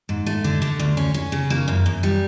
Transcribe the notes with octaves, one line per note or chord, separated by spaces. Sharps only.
G#2
A3
D3
D3
D2
C#4
C#4
C#3
A#3
F#2
F#2
G3